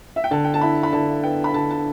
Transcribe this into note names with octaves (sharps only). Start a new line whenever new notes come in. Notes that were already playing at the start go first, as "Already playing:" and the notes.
E5
G5
D3 A5
G5
A5
E4 B5
B5
D3 A5
B3 G5
B5
D3 A5
A5